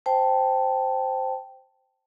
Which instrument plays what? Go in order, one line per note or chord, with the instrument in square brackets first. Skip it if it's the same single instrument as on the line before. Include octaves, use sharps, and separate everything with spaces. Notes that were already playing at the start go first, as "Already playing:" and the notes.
[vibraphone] C5 G5 A5